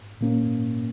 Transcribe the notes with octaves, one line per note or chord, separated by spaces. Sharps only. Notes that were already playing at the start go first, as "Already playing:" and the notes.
A#2 A#3 C#4